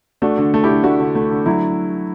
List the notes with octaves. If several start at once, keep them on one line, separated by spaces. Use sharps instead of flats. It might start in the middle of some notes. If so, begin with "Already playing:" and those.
A3 D4 F#4
D3
A3
E4 G4
D3
A3 D4 F#4
D3
A3
D3
F#3 E4